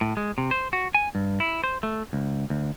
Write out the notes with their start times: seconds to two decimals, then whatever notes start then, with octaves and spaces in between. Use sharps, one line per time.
0.01 A2
0.17 G#3
0.38 C3
0.51 C5
0.73 F#4
0.95 G#5
1.15 G2
1.40 E4
1.64 C5
1.83 A3
2.13 C#2
2.50 D2